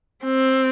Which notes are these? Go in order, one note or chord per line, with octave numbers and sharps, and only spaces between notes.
C4